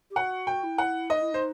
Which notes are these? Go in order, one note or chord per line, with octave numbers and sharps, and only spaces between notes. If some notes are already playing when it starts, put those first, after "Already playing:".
G4
F#4 F#5
G5
E4
F#5
D#4 D#5
E4
D#4 C5